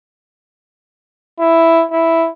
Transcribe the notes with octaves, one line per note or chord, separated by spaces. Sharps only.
E4
E4